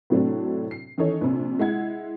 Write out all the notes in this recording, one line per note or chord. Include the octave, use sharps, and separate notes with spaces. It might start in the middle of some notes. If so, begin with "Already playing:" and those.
A2 C3 F#3 A3 C4 D4
C7
D#3 E3 C#4 D#4 A4 C#5
A#1 C3
G#3 E4 F#5 G#6